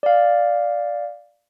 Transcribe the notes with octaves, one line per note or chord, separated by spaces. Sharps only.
D5 F5